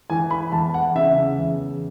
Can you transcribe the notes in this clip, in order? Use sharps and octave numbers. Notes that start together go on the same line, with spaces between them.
E3 G#5
B5
E2 A5
F#5
C#3 E5
E2